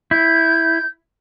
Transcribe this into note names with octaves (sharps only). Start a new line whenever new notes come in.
E4 G6